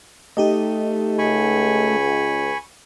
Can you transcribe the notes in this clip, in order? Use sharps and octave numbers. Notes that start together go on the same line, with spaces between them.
A3 D#4 G4 D#5
C#2 G#5 B5 C#6